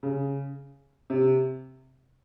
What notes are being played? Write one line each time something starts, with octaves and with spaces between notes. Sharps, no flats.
C#3
C3